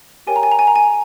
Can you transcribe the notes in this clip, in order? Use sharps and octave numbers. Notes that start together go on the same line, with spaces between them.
G4 A#4 C#5 G5 G#5
A#5
G#5
A#5
G#5
A#5
G#5